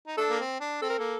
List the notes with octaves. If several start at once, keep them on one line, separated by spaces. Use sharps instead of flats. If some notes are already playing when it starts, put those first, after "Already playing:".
D#4
D4 A4
A#3
C4
D4
C4 A4
A#4
A#3 A4